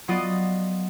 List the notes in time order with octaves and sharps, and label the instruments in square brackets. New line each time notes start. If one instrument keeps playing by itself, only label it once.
[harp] F#3 B3 F4 D5 D#5